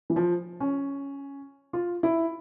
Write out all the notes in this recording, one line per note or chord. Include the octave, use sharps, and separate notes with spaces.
E3
F3
C#4
F4
E4